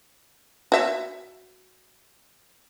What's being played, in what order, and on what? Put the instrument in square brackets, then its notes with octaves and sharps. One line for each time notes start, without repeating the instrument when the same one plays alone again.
[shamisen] F#4 E5